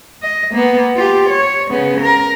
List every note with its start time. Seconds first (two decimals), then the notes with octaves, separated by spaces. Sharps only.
0.23 D#5
0.52 A#3 B3
0.97 F4 G4
1.30 C#5
1.70 C#3 B3
2.01 A#4